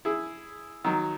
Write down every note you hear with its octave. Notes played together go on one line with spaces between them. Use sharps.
E4 G#4
D#3 F#3